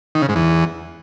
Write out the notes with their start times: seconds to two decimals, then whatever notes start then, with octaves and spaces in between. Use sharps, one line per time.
0.15 D#3
0.22 C#3
0.29 G#2
0.36 E2